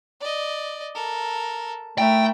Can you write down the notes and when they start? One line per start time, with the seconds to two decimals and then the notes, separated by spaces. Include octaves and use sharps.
0.21 D5 D#5
0.95 A4 A#4
1.98 A3 E4 A#4 G5